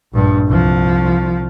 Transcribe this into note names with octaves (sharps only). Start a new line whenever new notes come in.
A#1 G2
C2 F3